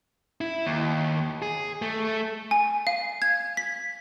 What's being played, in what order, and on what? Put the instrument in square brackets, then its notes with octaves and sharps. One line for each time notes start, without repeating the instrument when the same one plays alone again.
[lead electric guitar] E4
D#2
G#4
A3
[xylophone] G#5
F5
G#6
B6